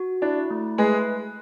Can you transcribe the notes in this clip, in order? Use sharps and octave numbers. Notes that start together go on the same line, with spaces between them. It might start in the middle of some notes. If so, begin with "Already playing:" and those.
Already playing: F#4
D4 E4
A3
G#3 G#4 B4